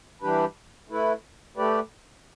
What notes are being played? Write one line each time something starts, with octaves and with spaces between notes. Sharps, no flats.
E3 G3 D4 G4 B4
A3 E4 B4
A3 G4 B4 D5